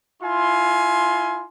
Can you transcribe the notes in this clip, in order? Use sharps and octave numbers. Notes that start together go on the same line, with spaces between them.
E4 F4 G#5 C6